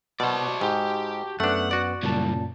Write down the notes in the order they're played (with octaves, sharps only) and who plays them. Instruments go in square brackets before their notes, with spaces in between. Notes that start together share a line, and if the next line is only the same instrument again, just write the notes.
[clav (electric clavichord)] B2 [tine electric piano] F#4 A5 C#6 [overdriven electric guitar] C5 D5
[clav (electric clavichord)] G#2 [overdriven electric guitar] G4
[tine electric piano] F#2 B3 [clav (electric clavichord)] A3 D4 [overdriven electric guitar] F#5
[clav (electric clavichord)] F#4 D5
[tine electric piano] F#2 A#2 A5 [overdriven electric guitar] C#3 G3